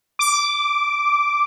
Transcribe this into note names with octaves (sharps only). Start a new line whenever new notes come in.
D6